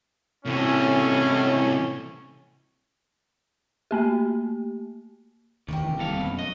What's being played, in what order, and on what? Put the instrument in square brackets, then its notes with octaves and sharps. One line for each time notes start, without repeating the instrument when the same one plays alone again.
[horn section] A2 C#4 [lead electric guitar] C3 E3
[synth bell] A3 A#3 G4
[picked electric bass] E1 D2 [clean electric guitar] D#3 [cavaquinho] G4 A#4 D5
[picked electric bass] C3 E3
[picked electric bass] F1 C3 G3 [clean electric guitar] D#2 A4 F5
[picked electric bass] F#2 B2 [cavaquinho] B5
[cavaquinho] B4 C#5 [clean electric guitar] D#5